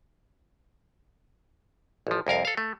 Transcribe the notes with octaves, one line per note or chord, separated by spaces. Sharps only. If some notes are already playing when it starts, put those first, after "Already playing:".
A1 F3
C2 F2 A#4 F5
A4 F5
A3